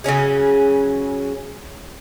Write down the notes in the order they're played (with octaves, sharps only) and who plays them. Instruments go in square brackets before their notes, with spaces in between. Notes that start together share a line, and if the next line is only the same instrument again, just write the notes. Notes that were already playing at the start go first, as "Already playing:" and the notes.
[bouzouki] C#3 F#3 C#4 G#4